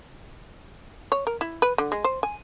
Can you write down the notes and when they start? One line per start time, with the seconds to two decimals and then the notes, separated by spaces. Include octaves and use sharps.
1.12 C#5
1.27 A#4
1.41 E4
1.62 B4
1.78 D3
1.92 G#3
2.04 C5
2.23 G#5